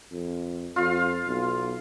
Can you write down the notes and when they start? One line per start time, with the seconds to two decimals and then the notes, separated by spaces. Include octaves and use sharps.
0.12 F2
0.76 F2 F4 F5
1.27 B1